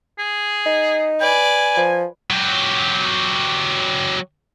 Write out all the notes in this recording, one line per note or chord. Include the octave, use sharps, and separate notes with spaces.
G#4
D#4
B4 D5 G#5
F3
F#3 G4